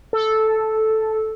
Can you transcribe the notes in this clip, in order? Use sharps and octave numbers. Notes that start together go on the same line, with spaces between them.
A4